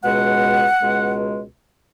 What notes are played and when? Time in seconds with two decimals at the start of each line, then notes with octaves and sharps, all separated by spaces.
0.03 C#2 B2 G#3 F#5
0.81 C#2 B2 G#3